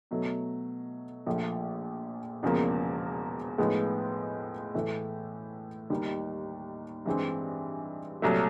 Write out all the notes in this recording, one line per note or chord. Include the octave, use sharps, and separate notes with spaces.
B2 F#3 A3
A#1 A#2 F3 A3
E1 E2 C#3 F3 A#3
A2 F3 G#3 B3 D#4
A2 E3 A3
D#2 D#3 G3
G2 E3 G#3 C4
C2 A#2 F#3 A3